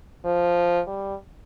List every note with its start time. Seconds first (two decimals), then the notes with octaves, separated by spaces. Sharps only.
0.25 F3
0.87 G3